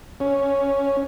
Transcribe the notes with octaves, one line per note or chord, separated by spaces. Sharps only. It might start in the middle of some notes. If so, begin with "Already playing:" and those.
C#4